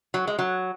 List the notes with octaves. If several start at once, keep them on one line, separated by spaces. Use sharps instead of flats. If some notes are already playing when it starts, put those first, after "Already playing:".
F#3
G#3
F#3